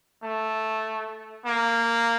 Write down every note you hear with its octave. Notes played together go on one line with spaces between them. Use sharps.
A3
A#3